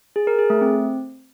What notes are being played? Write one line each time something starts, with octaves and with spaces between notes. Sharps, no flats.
G#4
A#4
G#4
A3
C4